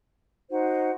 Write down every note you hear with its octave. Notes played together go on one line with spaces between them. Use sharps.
D#4 F#4 C5 F#5